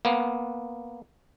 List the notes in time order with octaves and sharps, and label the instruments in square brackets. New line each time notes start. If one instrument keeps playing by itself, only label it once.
[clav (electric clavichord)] A#3 B3